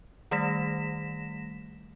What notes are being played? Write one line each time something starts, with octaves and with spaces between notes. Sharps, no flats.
D#3 G3 A3 A#6 B6 E7